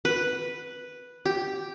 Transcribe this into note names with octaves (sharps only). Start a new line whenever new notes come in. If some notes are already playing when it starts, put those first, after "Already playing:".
B4
G4